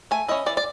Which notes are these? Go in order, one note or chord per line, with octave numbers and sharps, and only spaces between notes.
A3 G#5
C#4 E4 D#5
E3 D5
D5